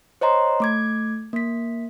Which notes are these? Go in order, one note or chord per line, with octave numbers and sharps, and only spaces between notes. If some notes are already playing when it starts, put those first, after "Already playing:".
C5 C#5 D#5 A#5 C6
A3 D6 G#6
A#3 B6